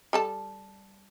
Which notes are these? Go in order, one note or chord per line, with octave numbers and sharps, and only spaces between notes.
G3 A4 A5